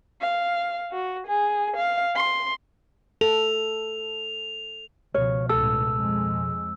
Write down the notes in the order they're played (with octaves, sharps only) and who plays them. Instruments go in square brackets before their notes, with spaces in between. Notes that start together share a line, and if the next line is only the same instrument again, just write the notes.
[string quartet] F5
F#4
G#4
F5
C6
[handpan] A4 [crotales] F7
[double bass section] C#2 F3 [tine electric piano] B2 F6 [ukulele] C#5
[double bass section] C#2 A2 [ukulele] A4 [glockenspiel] E6
[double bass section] F2 G#3